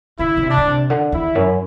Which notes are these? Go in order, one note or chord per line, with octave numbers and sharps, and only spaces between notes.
D3 E4
D3
C3
D4
D3
C3
D3
E2 E4
F#2